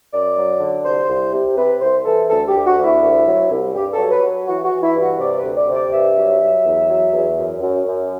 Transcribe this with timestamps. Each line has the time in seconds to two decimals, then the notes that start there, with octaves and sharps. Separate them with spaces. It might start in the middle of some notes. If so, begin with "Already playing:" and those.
0.12 F#2 D5
0.35 F#3
0.60 D3
0.84 C2 C5
1.08 C2
1.32 C3
1.56 C3 B4
1.81 C2 C5
2.04 E3 A4
2.28 D2 A4
2.47 G4
2.54 D2
2.65 F#4
2.77 D2
2.84 E4
3.02 C2
3.26 F#3
3.50 C2
3.74 G2 G4
3.92 A4
3.98 F#3
4.10 B4
4.23 F#3
4.46 E3 F#4
4.64 F#4
4.70 E3
4.82 E4
4.94 G2
5.01 F#4
5.19 C3 D5
5.37 B4
5.44 D2
5.56 D5
5.68 C3
5.73 D5
5.91 G2 E5
6.16 F#3
6.40 F#3
6.63 E2
6.88 F#3
7.13 E2
7.37 F#2
7.61 F#2
7.85 F#2